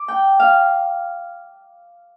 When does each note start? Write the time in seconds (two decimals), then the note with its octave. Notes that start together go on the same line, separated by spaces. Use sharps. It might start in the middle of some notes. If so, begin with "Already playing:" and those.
Already playing: D6
0.08 G5
0.40 F5